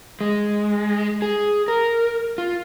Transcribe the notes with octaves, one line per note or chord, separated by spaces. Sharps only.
G#3
G#4
A#4
F4